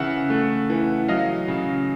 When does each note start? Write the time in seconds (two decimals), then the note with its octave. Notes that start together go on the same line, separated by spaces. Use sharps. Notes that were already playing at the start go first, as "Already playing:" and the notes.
Already playing: C#3 E3 E5 F#5
0.30 A3
0.70 E3
1.08 F#3 D#5 F5
1.48 C#3